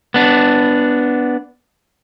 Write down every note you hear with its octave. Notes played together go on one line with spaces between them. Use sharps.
B3 D4